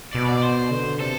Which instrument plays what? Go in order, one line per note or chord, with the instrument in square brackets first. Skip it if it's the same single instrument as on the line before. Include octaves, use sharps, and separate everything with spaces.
[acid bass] B2 [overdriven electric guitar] D5
[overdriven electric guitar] D5
C5
[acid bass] D3
[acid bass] C3 [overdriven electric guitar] A4